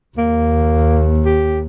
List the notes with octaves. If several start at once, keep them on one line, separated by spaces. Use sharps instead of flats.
D#2 A#3
G4